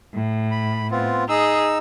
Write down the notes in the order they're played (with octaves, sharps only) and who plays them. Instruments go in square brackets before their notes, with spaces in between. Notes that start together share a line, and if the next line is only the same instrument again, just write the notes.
[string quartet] A2
[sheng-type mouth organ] B5
B3 C4 F4
[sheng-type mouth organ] D#4 E6 [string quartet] G#4